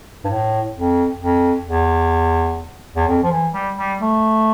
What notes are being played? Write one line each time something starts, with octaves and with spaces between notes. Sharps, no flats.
G2
A2
F2
F2
E2
E2
F2
F3
E3
G3
G3
A3